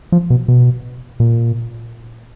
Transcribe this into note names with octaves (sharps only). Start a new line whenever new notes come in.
F3
B2
B2
A#2